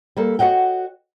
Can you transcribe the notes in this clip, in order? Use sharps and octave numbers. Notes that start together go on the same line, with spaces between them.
G3 A#3 A4
F#4 C#5 D#5 F#5 G5